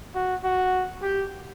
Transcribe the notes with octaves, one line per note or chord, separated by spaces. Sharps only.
F#4
F#4
G4